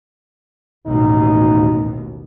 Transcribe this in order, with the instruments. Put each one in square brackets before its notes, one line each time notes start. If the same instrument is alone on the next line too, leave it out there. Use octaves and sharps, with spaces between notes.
[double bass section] A1 D#2 B2 [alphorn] D#4